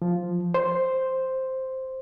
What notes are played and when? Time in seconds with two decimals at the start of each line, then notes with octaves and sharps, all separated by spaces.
0.02 F3
0.54 C5